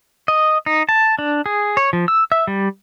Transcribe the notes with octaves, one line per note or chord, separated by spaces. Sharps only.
D#5
D#4
A5
D4
G#4
C#5
F3
E6
E5
G3